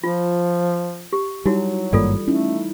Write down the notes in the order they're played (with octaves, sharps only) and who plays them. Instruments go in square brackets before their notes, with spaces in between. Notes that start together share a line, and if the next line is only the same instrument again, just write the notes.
[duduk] F3 [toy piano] F4
[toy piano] G4
[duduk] F#3 [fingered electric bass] G3 [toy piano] D#4 E4 F#4
[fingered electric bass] G#1 G2 A#3 [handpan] E3 G3 [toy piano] F4 A4 D5
[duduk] A3 [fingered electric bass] C#4 [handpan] D#4 E4